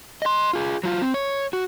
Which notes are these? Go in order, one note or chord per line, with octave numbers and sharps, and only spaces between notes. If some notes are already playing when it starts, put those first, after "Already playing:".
D#5 C6
F4 G#4
F#3 F4
C4
C#5
F#4